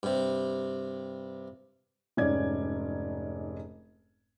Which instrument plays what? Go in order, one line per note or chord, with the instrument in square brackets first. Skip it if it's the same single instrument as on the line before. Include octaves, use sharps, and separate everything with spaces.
[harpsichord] G2 C3
[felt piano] F1 G#2 C#4 D5 G#6